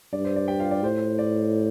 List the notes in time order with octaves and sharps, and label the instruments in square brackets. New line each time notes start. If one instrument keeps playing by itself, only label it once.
[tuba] G2 [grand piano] D5
[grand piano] C5
D5
G4 G5
F4 F5
D5
[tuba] A2 [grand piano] C5
[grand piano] D5